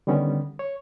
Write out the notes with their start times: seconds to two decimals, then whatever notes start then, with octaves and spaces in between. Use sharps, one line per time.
0.07 D3 D#3 G3 B3 C#4
0.59 C#5